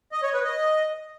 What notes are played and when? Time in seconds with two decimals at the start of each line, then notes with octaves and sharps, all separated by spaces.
0.12 D#5
0.23 C#5
0.33 B4
0.44 D#5